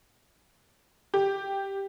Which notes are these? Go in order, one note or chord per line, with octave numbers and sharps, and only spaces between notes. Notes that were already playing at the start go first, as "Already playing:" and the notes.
G4